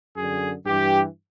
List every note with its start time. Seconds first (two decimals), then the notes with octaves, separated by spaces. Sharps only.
0.16 F#2 D3 G#4
0.66 G2 E3 G4